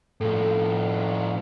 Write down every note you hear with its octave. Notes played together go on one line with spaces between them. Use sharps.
A2 F3 A4